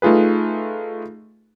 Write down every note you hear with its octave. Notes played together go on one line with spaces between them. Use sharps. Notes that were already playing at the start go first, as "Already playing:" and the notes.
A3 D#4 F4 G#4 B4